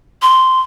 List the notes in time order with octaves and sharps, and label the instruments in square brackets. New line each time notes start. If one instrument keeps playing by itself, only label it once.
[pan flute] C6